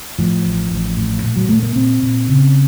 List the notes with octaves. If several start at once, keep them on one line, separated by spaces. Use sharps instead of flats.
A2 F3
A1
A1
A2
A#2
F#3
A#2 A3
A#3
A#2 C4
A#2
C#3